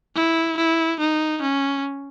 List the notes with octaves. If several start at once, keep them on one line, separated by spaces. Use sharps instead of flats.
E4
E4
D#4
C#4